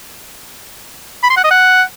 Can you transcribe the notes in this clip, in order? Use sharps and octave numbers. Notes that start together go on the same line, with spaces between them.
B5
C6
F#5
D#5
F#5